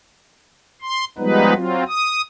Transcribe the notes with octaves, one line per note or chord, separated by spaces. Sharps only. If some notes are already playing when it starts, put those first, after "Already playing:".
C6
F3 G3 G#3 B3 D#4 B4
F#3 C4 F4
D#6